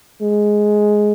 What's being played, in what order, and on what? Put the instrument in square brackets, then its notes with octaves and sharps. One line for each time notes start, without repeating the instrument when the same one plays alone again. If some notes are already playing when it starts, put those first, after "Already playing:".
[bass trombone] G#3